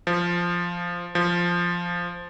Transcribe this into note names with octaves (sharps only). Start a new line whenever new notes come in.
F3
F3